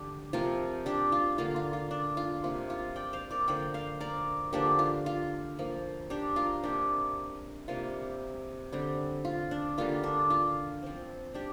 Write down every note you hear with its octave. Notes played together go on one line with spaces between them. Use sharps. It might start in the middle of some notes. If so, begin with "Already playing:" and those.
Already playing: D3 D4 G4
C3 F3 C4 F4 A#4
D4 G4
F4
D3 A#3 F4
F4
F4
D4
F4
C3 A#3 F4
F4
D5 G5
C5 F5
A#4 D5
D3 F3 A#3 D5 G5
C5 F5
A#4 D5
D3 F3 A#3 D4 G4
F4
F4
F3 A#3
D4 G4
F4 A#4
C3 A#3 D4 G4
C3 G3 A#3 F4
D3 G3 C4
F4
D4
D3 G3 A#3 F4
D4
F4
F3 C4
D4 G4